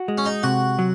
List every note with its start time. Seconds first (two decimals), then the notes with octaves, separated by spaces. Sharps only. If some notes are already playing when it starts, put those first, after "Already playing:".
Already playing: F#4
0.08 G#3
0.18 C#4
0.26 D#4
0.43 C3 F#4
0.79 F#3